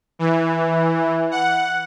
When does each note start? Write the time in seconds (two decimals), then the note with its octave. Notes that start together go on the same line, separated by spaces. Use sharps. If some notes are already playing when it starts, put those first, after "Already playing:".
0.19 E3
1.31 F#5